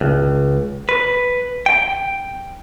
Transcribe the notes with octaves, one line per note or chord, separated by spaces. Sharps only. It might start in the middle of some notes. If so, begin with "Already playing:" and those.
C#2
B4
G5